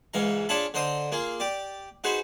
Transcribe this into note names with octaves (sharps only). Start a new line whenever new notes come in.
C#2 G#2 E3 F5 A#5
D4 F4 G#4 C#5 A5 B5
D3 C5 D#5 A#5 C6 D#6
A#3 F4 G#4
G4 D5
D#4 F#4 G#4 B4 C5